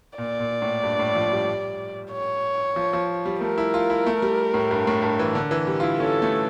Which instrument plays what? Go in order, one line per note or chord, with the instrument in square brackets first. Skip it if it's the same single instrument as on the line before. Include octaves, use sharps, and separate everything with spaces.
[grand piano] A#2 [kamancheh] D5
[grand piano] A#2
A2
G2
A2
F3
G3
[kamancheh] C#5
[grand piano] F3
F3
G3
[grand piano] A3 [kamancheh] A#4
[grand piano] E4
F4
E4
A3
G3
A2
G2
A2
G2
E3
D3
E3
G3
F4
E4
[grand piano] C#4 [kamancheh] A4
[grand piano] A3